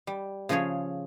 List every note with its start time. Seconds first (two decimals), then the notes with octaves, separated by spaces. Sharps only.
0.07 G3
0.49 C#3 F3 F4 G#4 C#5